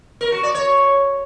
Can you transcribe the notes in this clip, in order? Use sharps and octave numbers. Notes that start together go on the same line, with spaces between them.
A#4
F#4
D5
C#5